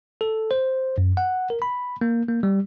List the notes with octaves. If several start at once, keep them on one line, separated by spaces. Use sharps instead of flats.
A4
C5
F#2
F#5
A#4
B5
A#3
A#3
G3